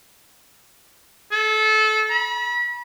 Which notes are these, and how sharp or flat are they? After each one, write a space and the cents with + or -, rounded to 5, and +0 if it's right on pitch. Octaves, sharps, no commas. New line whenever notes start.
A4 -25
B5 -35